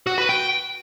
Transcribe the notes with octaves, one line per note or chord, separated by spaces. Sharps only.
F#4
B4
G5